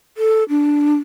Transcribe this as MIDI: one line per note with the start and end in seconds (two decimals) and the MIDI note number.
0.17 0.43 69
0.49 0.96 62